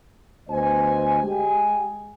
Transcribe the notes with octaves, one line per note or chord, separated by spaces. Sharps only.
D2 B3 C5 D#5 G#5
G#3 G4 G5 G#5